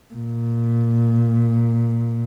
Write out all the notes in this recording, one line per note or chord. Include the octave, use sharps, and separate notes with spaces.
A#2